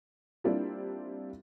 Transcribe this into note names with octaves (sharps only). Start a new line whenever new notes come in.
G3 A#3 C4 D4 E4 F4